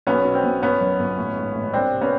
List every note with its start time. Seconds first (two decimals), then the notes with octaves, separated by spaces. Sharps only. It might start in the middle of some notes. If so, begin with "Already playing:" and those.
0.07 B1 B3 C#4
0.25 B2
0.35 C4
0.44 B1
0.62 G1 B3 C#4
0.81 F#2
0.99 G1
1.18 A1
1.36 G#2
1.55 A1
1.73 C2 C4 D4
1.92 C3
2.01 B3 C#4